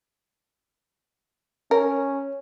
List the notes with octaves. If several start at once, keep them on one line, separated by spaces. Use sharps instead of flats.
C#4 A#4